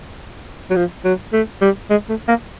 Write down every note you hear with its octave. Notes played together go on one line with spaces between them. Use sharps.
F#3
F3
F#3
A3
G3
G#3
A3
A#3